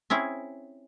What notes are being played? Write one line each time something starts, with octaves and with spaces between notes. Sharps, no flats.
C4 C#4 E4 G#4